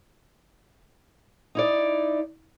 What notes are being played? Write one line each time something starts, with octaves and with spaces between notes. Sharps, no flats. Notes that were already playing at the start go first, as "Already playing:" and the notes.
D#4 E4 D5